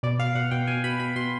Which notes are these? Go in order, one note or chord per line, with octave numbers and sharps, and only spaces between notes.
B2 D5
B2 F5
B2 F#5
B2 G5
B2 G#5
B2 B5
B2 B5
B2 C6